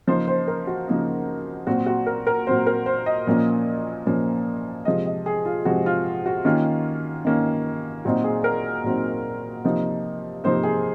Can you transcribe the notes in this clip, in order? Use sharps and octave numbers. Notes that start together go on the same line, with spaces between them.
C#3 F3 A#3 D#4 C5
C5
A#4
F#4
C#3 F3 A#3 D#4
A#2 F#3 C4 F#4
F#4
A#4
A#4
A#2 F#3 C4 C5
A#4
C5
D#5
A#2 F3 A#3 C#4
A#2 F3 A#3 C#4
C3 F3 G#3 D#5
D#5
G#4
F4
C3 F3 G#3 F#4
F4
F#4
D#3 A#3 C#4 F4
D#3 A#3 C#4
A#2 F#3 C4 D#4 F#4
G#4
A#4
A#2 F#3 C4 D#4
C3 F3 A#3 D#4
C3 F3 A#3 D#4 C5
G#4